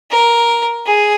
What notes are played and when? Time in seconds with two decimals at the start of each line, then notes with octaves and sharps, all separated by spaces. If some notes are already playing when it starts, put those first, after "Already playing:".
0.11 A#4
0.86 G#4